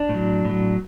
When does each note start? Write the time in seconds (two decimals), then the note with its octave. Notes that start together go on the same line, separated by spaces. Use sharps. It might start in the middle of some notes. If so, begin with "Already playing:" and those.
Already playing: D4
0.09 A2
0.14 F#3
0.45 A2 F#3